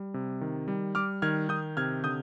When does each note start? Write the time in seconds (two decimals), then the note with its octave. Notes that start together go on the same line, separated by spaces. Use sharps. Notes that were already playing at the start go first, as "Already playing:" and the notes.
Already playing: G3
0.14 C3
0.41 D#3
0.68 G3
0.95 G3 D6 F6
1.22 D#3 F6 G#6
1.49 D#3 D#6 G6
1.77 C3 F6 G#6
2.04 D3 D#6 G6